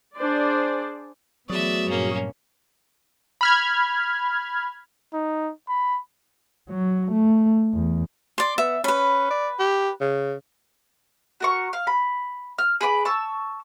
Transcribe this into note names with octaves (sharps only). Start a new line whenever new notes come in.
D4 G#4 C5 D5
E3 F#3 A3 B3 F#4 G#4 D5 E5
G2 A#2 A#3 C#4
B5 F6 G#6
D#4
B5
F#3
A3
E2
D5 C6
B3 E5
C#4 B4 B5
D5
G4
C#3
F#4 A#4 C#6
F5
B5
F6
G#4 B4 B5 D6
A5 C#6 E6